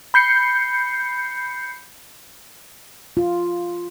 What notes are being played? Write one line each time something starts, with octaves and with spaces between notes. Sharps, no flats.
B5 G6 C7 C#7
F4